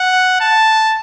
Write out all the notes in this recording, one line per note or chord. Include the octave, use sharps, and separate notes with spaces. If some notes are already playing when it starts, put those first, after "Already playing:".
Already playing: F#5
A5